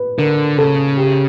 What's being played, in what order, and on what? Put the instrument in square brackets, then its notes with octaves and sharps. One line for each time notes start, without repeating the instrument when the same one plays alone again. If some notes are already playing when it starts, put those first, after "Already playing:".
Already playing: [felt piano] B4
[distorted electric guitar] D3 [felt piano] A#4
[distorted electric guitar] C#3 [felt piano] A4
[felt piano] G4